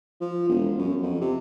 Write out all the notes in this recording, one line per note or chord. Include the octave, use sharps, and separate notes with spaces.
F3
E1
F#2
F2
C3